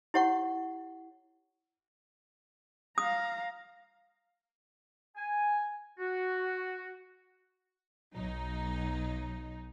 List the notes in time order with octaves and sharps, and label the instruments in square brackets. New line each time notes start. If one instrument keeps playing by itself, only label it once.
[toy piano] E4 G4 C#5 F#5 C#6
[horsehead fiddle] F5 A#5 [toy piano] D#6
[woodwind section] G#5
F#4
[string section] B1 F#3 D#4